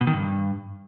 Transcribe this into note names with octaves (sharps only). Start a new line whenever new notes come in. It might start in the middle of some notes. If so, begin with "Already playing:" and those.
B2
D#3
G2